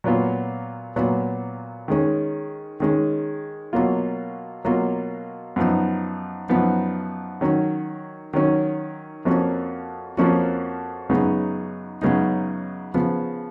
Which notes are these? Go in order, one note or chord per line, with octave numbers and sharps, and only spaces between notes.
A#2 F#3 B3 F4
A#2 F#3 B3 F4
D#3 G#3 C#4
D#3 G#3 C#4
B2 F#3 A#3 F4
B2 F#3 A#3 F4
F#2 F3 B3 D#4
F#2 F3 B3 D#4
D#3 F#3 C#4
D#3 F#3 C#4
F2 F3 A#3 C#4 F#4
F2 F3 A#3 C#4 F#4
F#2 C#3 G#3 B3 D#4
F#2 C#3 G#3 B3 D#4
C#3 F3 B3